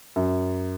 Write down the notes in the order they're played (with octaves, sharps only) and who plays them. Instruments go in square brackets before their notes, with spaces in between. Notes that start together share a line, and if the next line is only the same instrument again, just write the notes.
[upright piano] F#2